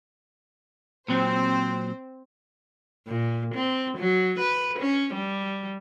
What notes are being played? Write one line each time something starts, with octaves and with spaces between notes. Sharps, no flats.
A#2 F#3 C4 C5
A#2
C4
F#3
B4
C#4
G3